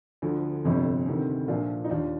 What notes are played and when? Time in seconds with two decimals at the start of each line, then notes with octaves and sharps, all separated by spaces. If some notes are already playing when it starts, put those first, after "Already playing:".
0.22 D2 D3 F3
0.65 G1 F2 C3
1.06 D2 C3 D#3
1.48 A#1 A#2 F3 D4 F4
1.84 D#4
1.90 D#2 D#3 D4 F4